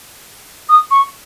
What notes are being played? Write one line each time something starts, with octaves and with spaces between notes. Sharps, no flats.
D#6
C#6